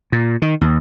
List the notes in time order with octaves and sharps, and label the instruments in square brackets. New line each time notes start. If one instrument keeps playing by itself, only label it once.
[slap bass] A#2
D#3
D#2